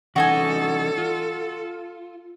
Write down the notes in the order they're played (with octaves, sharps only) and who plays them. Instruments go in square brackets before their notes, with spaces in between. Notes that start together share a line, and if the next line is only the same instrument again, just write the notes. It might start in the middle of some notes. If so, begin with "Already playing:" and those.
[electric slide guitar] E3 C#4 D#4 [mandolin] F#4 D#5 G#5 [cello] A4
[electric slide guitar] F4